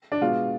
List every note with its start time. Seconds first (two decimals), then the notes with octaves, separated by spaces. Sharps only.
0.12 D4
0.21 B2 G#3 F4